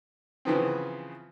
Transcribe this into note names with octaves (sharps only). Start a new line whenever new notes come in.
C#3 E3 F3 B3 C4